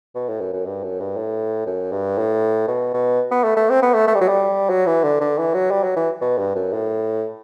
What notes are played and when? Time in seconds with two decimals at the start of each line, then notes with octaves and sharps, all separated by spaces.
0.15 B2
0.29 A2
0.41 F#2
0.53 F#2
0.66 G2
0.83 F#2
1.00 G2
1.17 A2
1.66 F#2
1.92 G2
2.18 A2
2.68 B2
2.94 B2
3.31 B3
3.43 A3
3.57 A3
3.70 C4
3.82 B3
3.94 A3
4.07 A3
4.15 G3
4.21 F#3
4.28 G3
4.70 F#3
4.87 E3
5.04 D3
5.21 D3
5.38 E3
5.54 F#3
5.71 G3
5.84 F#3
5.96 E3
6.21 B2
6.38 G2
6.55 F#2
6.72 A2